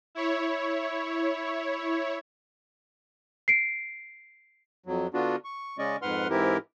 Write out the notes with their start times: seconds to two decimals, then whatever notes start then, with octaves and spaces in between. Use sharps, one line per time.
0.15 E4 C#5
3.48 C7 D7
4.86 F2 F#3
5.14 D3 B3 D4 F4 F#4
5.44 C#6
5.78 C#3 G#3 C#4 D5 D#5 C#6
6.02 F2 G#2 B4 F#5 C6 F6
6.30 G#2 E3 C4 E4 G4 A#4